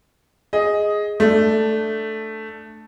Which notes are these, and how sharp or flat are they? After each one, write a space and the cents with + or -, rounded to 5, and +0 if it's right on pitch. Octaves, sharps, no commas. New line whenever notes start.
G#4 +0 D#5 +10
A3 +0 D4 +10